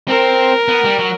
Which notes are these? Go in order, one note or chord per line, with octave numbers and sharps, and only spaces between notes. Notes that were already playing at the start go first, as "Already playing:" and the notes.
C4 A#4
B3
G3
F#3